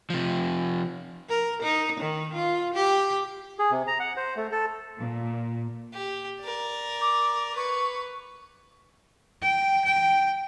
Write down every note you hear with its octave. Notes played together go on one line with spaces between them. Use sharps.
C3 F3
A#4
D#4
D#3
F4
G4
G#4
C3
A#5
F#5
C5
A3
A4
A#2
G4
A#4 D5
D6
B4 C#6
G5
G5